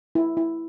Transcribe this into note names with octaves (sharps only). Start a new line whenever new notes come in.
E4
E4